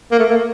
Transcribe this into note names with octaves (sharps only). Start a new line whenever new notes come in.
A#3
A3
A#3